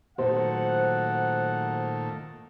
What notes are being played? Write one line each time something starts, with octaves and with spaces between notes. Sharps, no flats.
A#2 D#3 F#3 A3 C5 F#5